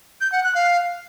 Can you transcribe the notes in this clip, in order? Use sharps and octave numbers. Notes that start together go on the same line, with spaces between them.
G6
F#5
F#6
F5